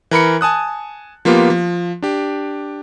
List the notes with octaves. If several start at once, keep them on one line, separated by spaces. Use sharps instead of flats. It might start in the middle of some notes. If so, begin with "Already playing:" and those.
E3 A#4 B5 C#7
G#5 A5 D#6 F#6
F3 A#3 B3 F4 G4
F3
D4 G4